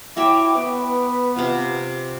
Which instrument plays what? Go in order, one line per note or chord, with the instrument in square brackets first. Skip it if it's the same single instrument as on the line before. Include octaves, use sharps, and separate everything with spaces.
[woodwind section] E4 G5 D6 [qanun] F#4 C#5 E5
[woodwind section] B3 B4
[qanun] C3 F4